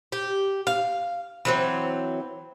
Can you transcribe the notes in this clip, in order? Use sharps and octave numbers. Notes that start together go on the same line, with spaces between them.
G4
F5
E3 F#3 C4